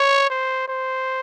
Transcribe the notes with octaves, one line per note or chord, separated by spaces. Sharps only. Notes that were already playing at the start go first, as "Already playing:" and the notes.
Already playing: C#5
C5
C5